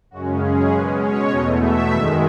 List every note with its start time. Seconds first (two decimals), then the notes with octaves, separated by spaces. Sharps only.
0.11 F#2 C#3 G#3 C#4 F#4
0.42 G#4
0.71 B2 G#3 C#4 B4
1.01 C#5
1.31 E2 B2 A3 D#5
1.61 E5
1.91 F#2 D#3 G#3 E5